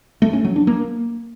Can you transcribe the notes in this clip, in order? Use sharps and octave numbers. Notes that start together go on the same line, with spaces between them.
A3
C#4
F#3
D4
A#3